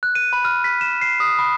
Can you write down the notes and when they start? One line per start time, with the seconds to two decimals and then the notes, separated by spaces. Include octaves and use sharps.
0.03 F#6
0.15 D#7
0.33 B5
0.45 F6
0.64 B6
0.81 E7
1.02 C7
1.20 D#6
1.39 B5